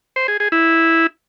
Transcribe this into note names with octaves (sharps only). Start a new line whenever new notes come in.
C5
G#4
G#4
E4